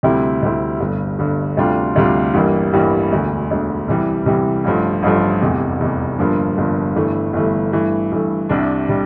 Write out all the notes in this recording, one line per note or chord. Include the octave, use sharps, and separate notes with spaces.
D2 C3 G3 C4 E4
D2 C3 G3 C4 E4
G1 G2 D3
G1 G2 D3
D2 C3 G3 D4 F4
D2 C3 G3 D4 F4
A1 G2 E3 G3 A#3
A1 G2 E3 G3 A#3
E1 D2 D3
E1 D2 D3
C2 C3 E3 G3
C2 C3 E3 G3
A1 G2 F3 A3
A1 G2 F3 A3
F1 E2 C3
F1 E2 C3
G1 G2 F3 A#3 D4
G1 G2 F3 A#3 D4
G1 G2 E3 A3
G1 G2 E3 A3
G2 E3 A3
G2 E3 A3
C2 C3 G3 D4
C3 G3 D4